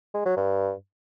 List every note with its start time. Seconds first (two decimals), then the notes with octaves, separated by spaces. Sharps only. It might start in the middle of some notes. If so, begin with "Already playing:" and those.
0.14 G#3
0.25 F#3
0.36 G2